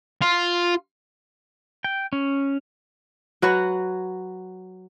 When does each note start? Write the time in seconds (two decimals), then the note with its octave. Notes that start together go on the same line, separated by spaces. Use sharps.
0.22 F4
1.84 G5
2.13 C#4
3.42 F#3 F#4 B4 C#5